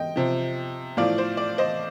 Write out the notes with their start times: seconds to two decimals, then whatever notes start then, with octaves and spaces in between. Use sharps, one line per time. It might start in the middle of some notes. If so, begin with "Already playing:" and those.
Already playing: D#5 G5
0.16 C3 F3
0.97 A2 F3 D5 F5
1.18 C5
1.37 D5
1.58 C5 D#5